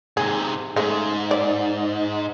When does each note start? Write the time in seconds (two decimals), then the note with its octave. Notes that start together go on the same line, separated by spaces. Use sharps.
0.17 G#2 C3 G#4
0.76 G#2 C#3 A3
1.31 D5